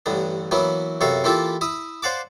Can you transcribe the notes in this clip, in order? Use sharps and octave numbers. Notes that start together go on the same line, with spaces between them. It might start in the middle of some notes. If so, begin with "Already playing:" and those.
A1 G2 D3 B3
E3 F#3 A#3 B3 E4
F#2 C3 B3 A4 F5 C#6
E3 A#3 E4 F4 G4 A4
E4 E5 D#6
C5 D5 F5 F#5 A5 D6